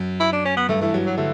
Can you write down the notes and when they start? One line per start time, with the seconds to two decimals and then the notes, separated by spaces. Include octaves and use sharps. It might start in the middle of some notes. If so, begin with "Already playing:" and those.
Already playing: F#2
0.20 E4
0.33 D4
0.45 C#4
0.57 B3
0.69 G2 A3
0.81 E3 A3
0.94 F#3
1.06 F#3
1.17 D3 A3